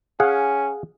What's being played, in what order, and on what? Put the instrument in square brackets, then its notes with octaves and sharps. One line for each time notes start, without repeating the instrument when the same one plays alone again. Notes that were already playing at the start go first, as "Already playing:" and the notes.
[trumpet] C#4 [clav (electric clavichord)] G#4 F5 F#5